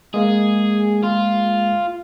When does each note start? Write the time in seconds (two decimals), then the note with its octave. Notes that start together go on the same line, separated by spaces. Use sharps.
0.14 G#3 A#3 G#4
1.04 F4